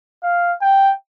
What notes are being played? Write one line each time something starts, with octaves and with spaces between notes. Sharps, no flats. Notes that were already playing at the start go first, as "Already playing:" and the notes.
F5
G5